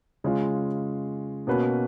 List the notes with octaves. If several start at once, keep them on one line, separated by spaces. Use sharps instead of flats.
C#3 G#3 C#4 F4
B2 A#3 C#4 F#4 B4